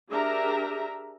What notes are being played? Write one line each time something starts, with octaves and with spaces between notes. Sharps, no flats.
D4 G4 G#4 A#4 E5 A#5